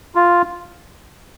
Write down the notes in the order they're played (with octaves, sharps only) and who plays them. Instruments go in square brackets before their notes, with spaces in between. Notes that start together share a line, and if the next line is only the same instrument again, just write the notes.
[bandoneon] F4